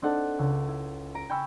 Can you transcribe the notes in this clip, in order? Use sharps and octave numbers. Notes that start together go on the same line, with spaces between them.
C4 D4 D#4 A4 F#5
C#2
E4
A#5 D7
G5 G#5 B5 C#6 E6 F6